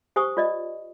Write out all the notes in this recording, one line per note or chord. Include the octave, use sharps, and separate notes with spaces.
G4 C5 G#5 C#6 D#6
F4 D5 D#5